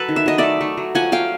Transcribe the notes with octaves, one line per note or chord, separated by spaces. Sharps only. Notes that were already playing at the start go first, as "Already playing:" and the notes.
Already playing: F#3 A4 B4
D#3
E5
F#3 D#5
A3 D5 E5
A3
F#3
F3 F#5 G#5
F3 F5 G5